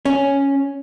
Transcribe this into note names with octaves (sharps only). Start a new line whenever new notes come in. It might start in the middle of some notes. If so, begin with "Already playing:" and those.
C#4